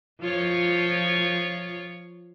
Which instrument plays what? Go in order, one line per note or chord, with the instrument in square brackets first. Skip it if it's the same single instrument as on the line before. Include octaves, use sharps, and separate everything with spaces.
[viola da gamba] F3 F4 C#5